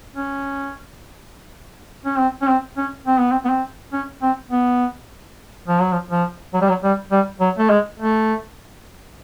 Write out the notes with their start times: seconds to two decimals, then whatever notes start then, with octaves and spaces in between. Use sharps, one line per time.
0.15 C#4
2.05 C#4
2.19 C4
2.42 C#4
2.48 C4
2.77 C#4
3.06 C4
3.19 B3
3.32 C4
3.45 B3
3.49 C4
3.93 C#4
4.23 C4
4.51 B3
5.68 F3
5.81 F#3
5.93 F3
6.11 F3
6.54 F#3
6.62 G3
6.69 F#3
6.84 G3
7.12 G3
7.41 F#3
7.59 A3
7.70 G#3
8.00 A3